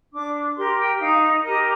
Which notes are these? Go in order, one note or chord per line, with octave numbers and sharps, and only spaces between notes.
D4 D6
G4 A#4 C6
G5
D#4 F5
D#5
G4 A#4 D#5